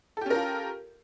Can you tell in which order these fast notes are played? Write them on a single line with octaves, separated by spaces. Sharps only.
A4 G4 C#4 A#4 F4